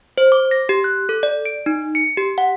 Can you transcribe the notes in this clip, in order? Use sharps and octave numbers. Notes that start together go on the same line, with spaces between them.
C5
D6
A#6
G4
F#6
A4
D5
D7
D#4
C#7
G4
F#5